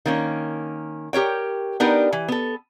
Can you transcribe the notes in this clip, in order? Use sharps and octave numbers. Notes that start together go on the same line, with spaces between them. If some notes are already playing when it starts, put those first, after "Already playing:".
D#3 A#3 C#4
G4 A#4 C#5 G5
B3 D4 D#4 G4 A#4 B4
E3
B3 A4